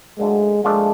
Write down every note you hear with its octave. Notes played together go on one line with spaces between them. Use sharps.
D2 D3 F#3 G#3 A#3
A#2 F3 G#3 A3 D4 F4